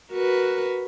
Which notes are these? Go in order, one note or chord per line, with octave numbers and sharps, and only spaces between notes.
F#4 A#4 B4